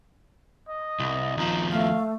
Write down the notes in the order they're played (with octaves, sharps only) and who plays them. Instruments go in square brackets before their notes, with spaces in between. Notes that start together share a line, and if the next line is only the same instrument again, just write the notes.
[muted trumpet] D#5
[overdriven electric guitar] C2
[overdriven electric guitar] D#2 F3 [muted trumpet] D#4
[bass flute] A3 [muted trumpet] F5